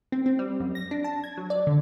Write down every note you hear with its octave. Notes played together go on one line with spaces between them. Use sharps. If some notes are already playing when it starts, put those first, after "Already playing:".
C4
C4
G3
F#2
A#6
D4
A5
G#6
F#3
D5
D3